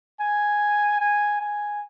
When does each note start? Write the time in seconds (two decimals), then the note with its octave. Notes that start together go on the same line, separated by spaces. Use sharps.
0.20 G#5
1.00 G#5
1.41 G#5